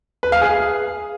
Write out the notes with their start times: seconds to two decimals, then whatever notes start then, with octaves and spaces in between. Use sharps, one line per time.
0.23 B4
0.32 F5
0.41 G#4